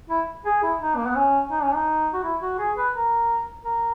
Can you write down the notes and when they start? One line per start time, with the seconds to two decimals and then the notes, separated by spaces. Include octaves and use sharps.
0.10 E4
0.46 G#4
0.63 E4
0.81 D#4
0.97 A#3
1.07 B3
1.16 C#4
1.51 D#4
1.63 C#4
1.75 D#4
2.13 F#4
2.24 E4
2.41 F#4
2.59 G#4
2.77 B4
2.95 A#4
3.65 A#4